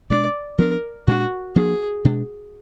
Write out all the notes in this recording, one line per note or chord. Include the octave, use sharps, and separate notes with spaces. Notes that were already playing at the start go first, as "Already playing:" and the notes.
B2 G#3 B3 D4 D5
F3 B3 D4 A#4
A#2 G#3 D4 F#4
F3 A#3 D4 G#4
B2 G#3 D4